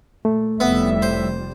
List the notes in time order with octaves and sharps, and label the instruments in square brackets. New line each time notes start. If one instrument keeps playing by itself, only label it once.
[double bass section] A#2 [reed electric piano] A3
[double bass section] F1 F2 G3 [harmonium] A2 E5 [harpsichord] B3
[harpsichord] C5